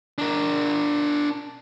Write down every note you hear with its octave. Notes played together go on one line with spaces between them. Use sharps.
D4 A#4